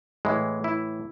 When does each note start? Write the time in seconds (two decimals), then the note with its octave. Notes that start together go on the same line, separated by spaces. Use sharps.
0.25 A2 E3 G#3
0.64 E4